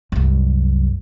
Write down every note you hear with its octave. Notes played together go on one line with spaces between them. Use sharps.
C2 F#2